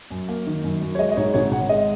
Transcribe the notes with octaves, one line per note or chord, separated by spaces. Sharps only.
F#2
A#3
D#3
F#2
F#2
C#5
G#3 D#5
D#5
G#2 C#5
G#1 C#5
G#1 F#5
G#3 D#5